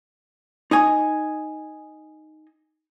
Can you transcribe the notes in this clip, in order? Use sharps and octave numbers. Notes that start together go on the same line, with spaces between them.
D#4 D#5 G#5